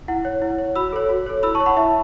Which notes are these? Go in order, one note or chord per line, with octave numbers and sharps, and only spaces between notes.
E4 F#5
C#5
E4
C#5
F#4 B5 E6
A4 C#5
F#4
A4 C#5
E4 B5 E6
A5 C#6
C#5
F#5 B5
E4 E5 A5